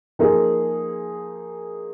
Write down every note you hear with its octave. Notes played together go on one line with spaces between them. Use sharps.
F3 A#3 D#4 G#4